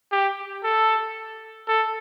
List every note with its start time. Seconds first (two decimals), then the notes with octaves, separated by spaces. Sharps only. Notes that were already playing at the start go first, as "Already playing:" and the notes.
0.12 G4
0.64 A4
1.68 A4